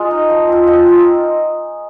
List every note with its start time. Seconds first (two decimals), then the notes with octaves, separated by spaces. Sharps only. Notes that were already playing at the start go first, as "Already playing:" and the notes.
Already playing: G#3 F4 C5 D#5
0.11 D#4
0.30 F3
0.48 C4 F4
0.67 F3 D#5
0.86 C4 F4